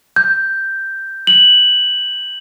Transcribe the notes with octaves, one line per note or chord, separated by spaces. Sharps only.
G6
F#7